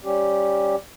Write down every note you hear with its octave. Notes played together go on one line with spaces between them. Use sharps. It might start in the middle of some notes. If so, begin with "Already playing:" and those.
G3 C#4 G4